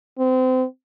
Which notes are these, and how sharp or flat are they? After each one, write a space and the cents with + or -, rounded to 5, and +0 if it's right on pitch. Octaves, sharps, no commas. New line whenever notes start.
C4 -30